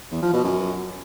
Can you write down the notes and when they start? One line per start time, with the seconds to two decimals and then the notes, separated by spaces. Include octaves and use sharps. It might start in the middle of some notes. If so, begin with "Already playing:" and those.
0.12 E2
0.22 F3
0.33 B2
0.44 F#2